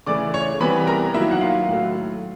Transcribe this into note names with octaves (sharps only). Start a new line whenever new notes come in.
C#3 E3 A3 D5 D6
C#5 C#6
C3 E3 G3 B3 B4 B5
A#4 A#5
D#3 F#3 A#3 E4 E5
F#5
F4 F5
A2 F#3 A3